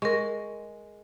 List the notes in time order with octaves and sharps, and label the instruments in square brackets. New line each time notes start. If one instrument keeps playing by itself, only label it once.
[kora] G#3 [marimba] A#4 C#6